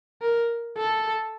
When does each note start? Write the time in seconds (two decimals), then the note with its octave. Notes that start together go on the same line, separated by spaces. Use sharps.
0.22 A#4
0.77 A4